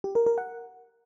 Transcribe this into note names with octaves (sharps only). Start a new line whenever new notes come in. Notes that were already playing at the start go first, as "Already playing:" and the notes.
G4
A#4
A#4
F#5